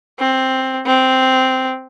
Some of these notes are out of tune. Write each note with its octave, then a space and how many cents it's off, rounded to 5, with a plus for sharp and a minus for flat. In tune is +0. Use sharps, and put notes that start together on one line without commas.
C4 +5
C4 -5